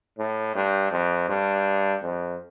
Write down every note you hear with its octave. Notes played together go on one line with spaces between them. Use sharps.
A2
G2
F2
G2
F2